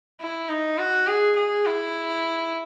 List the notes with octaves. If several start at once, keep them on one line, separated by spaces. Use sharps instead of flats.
E4
D#4
F#4
G#4
G#4
E4